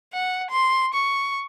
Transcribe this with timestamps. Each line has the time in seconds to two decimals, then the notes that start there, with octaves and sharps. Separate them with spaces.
0.13 F#5
0.50 C6
0.94 C#6